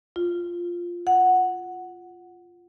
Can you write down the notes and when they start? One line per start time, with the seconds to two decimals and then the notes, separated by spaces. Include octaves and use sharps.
0.16 F4
1.07 F#5